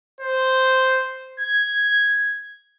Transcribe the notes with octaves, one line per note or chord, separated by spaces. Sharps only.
C5
G#6